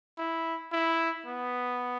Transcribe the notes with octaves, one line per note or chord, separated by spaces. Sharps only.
E4
E4
B3